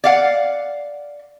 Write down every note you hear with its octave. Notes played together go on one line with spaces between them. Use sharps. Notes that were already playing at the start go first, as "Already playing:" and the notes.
D5 F5 F#5